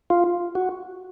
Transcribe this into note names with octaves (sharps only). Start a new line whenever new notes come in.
F4
F#4